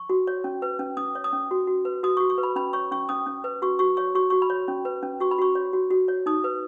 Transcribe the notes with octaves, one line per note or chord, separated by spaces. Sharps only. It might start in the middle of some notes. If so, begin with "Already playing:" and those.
Already playing: C#6
F#4
C#5
C#4
B4
C#4
C#4 D#6
C#5
D#6
C#4
F#4
F#4
B4
F#4 D#6
F#4 C#6
C#6
B4
B5
C#4 B5
C#5 C#6
C#4 C#6
C#4 D#6
C#4
B4
F#4 C#6
F#4 C#6
C#5 C#6
F#4 C#6
F#4 C#6
B5
C#5
C#4
B4
C#4
F#4 C#6
B5
F#4 C#6
C#5
F#4
F#4
C#5
D#4 D#6
B4